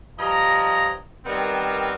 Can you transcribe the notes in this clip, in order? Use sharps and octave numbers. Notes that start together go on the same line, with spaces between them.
G2 F3 D#5 A#5
D#3 G3 B3 C4 A#4